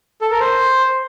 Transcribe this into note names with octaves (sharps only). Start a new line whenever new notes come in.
A4
A#4
C5